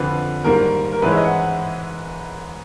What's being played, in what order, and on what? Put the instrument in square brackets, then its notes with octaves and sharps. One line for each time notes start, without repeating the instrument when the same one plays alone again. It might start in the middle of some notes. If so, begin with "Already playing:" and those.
Already playing: [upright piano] F2 D3 F3 B4
G#2 D#3 G3 A#3 A#4
A#4
G#2 E3 G#3 C#4 B4
E5
D#5
F#5